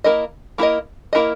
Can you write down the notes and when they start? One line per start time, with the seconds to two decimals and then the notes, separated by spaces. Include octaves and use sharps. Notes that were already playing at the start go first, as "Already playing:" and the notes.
0.04 A#3 E4 A#4 D#5
0.58 A#3 E4 A#4 D#5
1.13 A#3 E4 A#4 D#5